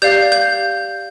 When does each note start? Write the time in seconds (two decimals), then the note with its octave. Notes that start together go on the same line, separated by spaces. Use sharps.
0.02 G4 D5 F5 G6
0.32 G6